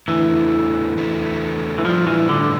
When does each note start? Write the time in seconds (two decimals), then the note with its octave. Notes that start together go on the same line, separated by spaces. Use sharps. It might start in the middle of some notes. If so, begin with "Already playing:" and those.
0.08 E2 D3 E3 A3
0.97 E2 D3 A3
1.78 E3
1.84 A2 F3 G3 D4 F4
2.07 E3
2.29 D3